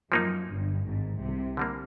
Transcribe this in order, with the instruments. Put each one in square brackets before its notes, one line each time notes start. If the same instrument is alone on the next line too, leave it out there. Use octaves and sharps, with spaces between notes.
[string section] F#2 [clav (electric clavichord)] F3 A#3 D#4
[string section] G1 G2
G#1 G#2
C2 C3
[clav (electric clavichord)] D3 G3 A#3